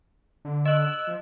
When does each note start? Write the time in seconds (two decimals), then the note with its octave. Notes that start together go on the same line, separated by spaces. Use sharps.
0.45 D3
0.66 D#5 E6 F#6
1.07 F3